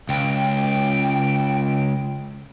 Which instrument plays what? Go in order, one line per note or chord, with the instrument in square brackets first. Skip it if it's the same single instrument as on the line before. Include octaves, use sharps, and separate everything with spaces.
[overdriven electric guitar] C#2 [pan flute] G5